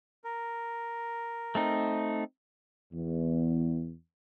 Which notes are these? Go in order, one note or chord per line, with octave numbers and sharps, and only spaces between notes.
A#4
A3 C4 D#4
E2